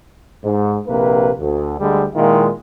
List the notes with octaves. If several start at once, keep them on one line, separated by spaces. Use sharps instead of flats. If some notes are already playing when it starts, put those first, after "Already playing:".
G#2
A#1 C3 A#3 B4
D2
D2 D3 G3 G#3
A#2 D#3 G#3 E4 F4